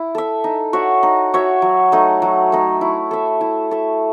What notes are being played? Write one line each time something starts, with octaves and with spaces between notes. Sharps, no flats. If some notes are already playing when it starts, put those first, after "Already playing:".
Already playing: E4
A4 E5
D#4
F#4 C#5 E5
D#4
F#4 C#5 E5
F#3
A3 D#4
F#3
A3 D#4
E4
A4 E5
E4
A4 E5